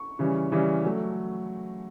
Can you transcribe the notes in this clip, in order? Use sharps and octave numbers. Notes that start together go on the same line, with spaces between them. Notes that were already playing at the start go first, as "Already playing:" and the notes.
Already playing: C#6
C#3 E3 G3 C#4
C#3 E3 G3 C#4
F#3 A3